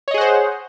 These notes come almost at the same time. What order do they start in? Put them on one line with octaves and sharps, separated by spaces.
C#5 D#5 G#4 F#5 C5